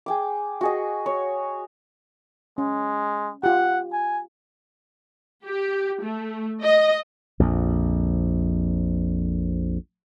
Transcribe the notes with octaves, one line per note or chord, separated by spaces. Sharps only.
G#4 G5 D6
F#4 G#4 D#5
C#5
G#3 C#4
F4 G4 F#5
G#5
G4
A3
D#5
A#1 F2